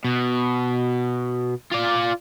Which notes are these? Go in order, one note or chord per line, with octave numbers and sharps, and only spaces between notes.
B2
F4 D5